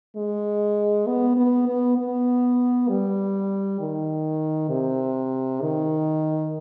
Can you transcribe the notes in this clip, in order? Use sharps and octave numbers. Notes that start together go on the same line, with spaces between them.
G#3
B3
B3
B3
B3
G3
D#3
C3
D#3